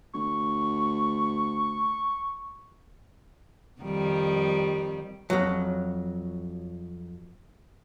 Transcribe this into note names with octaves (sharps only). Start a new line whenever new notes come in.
D2 C#6
F2 D#3 G3
F2 F#3